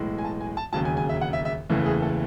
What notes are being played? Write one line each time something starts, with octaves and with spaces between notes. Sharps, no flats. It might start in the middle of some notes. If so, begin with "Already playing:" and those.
Already playing: B1 A2 E3 G#3
G#5
A5
G#5
A5
E1 D#2 C#3 F#3 A5
G#5
G#5
E5
F#5
E5
E5
F#1 E2 C#3 E3 A3
G#4
A4